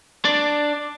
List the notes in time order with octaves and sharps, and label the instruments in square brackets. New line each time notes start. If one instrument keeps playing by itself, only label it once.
[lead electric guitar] D4 D5